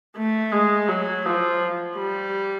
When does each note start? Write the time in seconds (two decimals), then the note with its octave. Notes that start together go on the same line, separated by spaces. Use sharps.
0.17 A3
0.53 G#3
0.89 F#3
1.25 F3
1.97 G3